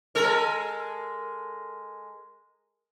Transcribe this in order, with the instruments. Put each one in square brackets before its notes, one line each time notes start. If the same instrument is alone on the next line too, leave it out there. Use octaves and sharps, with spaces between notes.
[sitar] G#3 A4 A#4